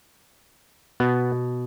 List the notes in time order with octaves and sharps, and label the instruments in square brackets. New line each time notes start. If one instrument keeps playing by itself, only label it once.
[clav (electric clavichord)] B2 B3